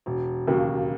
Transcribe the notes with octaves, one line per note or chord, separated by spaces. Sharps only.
E1
D#2 C#3 F#3 A#3